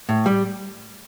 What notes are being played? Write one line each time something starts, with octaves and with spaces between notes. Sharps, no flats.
A2
G3